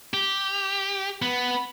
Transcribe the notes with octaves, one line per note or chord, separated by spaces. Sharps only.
G4
B3